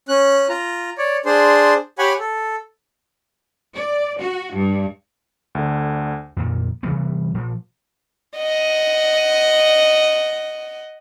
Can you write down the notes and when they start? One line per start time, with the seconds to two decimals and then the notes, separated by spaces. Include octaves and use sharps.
0.09 C#4 F#6
0.49 F4 A#5
0.98 C#5 D5
1.26 D4 G#4 C5 C6
1.99 G4 C#5 F#5 G#5 B5
2.20 A4
3.75 D5
4.19 F#4
4.55 G2
5.55 D2 D3
6.37 F2 A#2 D#3
6.83 C3 E3 G3 B3
7.35 A#2 F3
8.38 D#5 F#5